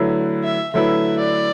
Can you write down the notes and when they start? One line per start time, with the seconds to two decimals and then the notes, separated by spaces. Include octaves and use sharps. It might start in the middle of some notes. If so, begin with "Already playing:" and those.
Already playing: D3 F#3 A3 E4 B4
0.44 E5
0.73 D3 F#3 A3 E4 B4 E5
1.19 D5